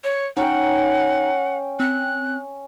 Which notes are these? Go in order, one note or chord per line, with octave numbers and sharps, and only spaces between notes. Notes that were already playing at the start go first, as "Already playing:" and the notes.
C#5
C#4 D#4 F#5 G5
C4 F#6